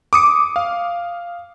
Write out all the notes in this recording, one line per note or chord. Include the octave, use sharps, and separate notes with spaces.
D6 D#6 C#7
F5